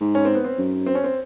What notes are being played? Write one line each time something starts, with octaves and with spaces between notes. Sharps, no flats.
G#2
C#4
C4
B3
C4
F#2
C4
C#4
C4